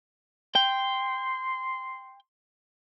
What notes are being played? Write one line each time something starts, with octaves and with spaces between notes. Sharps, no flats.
G5 C6